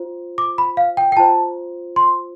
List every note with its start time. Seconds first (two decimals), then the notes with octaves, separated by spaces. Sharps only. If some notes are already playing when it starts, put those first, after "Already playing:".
Already playing: F4 C5
0.38 D6
0.58 B5
0.77 F5
0.97 G5
1.12 G5
1.17 F4 C5 A5
1.96 C6